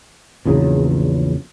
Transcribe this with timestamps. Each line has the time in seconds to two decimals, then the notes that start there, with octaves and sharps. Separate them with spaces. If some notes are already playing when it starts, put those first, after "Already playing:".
0.45 A#1 E2 C#3 F#3